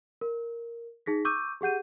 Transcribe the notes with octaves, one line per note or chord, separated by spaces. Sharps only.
A#4
D#4 G#4 A#6 B6
C#6 D6 E6 G6 D#7
G4 G#4 F#5 G6 D#7